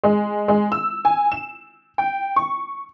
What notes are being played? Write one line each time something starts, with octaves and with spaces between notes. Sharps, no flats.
G#3
G#3
E6
G#5
E7
G5
C#6